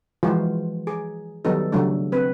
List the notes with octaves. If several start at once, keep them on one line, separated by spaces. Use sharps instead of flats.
E3 F3 G#3 F4 F#4 C5
G#4
D#3 F#3 G3 B3 D#4 A4
C#3 F#3 G3 A3 D4
C4 B4